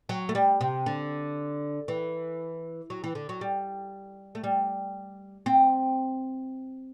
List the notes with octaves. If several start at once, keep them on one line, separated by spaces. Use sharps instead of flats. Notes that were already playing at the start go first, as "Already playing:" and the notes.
F#3
A3
G3
C3
D3
E3
F#3
E3
D3
F#3
G3
A3
G3
C4